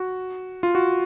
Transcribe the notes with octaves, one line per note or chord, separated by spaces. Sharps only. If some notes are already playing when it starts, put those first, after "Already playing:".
Already playing: F#4
F4
F#4